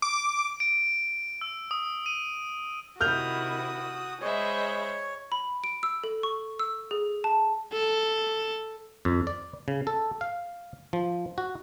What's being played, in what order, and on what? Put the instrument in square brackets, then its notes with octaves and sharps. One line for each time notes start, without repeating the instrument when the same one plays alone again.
[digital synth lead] D6
[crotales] D7
E6
D#6
D#7
[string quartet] C3 D#3 E4 [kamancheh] F#4 D#6 [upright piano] F6 G6 F7
[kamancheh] G#3 C5 [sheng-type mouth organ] C#5 [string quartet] D#5 E5 B5
[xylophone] B5
D7
E6
A4
C#6
E6
G#4
A5
[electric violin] A4
[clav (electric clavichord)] F2
D5
C#3
A4
F5
F3
F#4